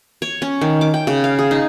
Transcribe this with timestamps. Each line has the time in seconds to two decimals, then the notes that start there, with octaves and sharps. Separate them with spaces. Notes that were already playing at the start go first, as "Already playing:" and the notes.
0.22 C#5
0.42 C#4
0.61 D#3
0.81 D6
0.94 G5
1.07 C#3
1.24 F5
1.39 G#4
1.51 D#4